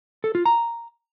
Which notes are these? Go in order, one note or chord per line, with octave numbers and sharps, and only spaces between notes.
A4
F4
A#5